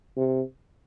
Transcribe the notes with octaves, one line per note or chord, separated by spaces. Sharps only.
C3